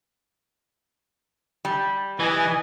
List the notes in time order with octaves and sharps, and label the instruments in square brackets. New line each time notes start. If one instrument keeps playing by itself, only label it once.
[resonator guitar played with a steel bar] G3
[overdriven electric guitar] E3 [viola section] B4 D#5 G#5